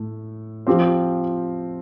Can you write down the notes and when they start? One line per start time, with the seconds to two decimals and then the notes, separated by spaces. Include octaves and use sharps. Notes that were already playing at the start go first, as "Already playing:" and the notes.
Already playing: A2 A3
0.67 F3 C4 G4 C5